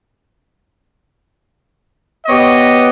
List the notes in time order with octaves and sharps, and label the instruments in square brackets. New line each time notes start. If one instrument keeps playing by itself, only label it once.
[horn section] B3 G4 C#5 D#5